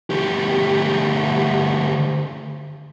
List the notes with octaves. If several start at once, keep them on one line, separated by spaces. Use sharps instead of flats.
D2 G4